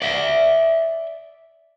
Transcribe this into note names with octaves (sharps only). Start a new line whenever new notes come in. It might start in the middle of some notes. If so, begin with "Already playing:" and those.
D5 E5